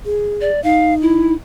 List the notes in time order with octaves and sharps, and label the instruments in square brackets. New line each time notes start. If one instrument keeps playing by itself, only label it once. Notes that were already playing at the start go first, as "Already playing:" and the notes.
[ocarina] G#4
[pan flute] D5
[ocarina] D#4 [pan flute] F5
[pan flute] E4